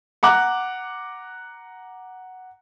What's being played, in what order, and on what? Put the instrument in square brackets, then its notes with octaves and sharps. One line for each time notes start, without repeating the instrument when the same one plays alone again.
[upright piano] F#5 A#5 D6 F#6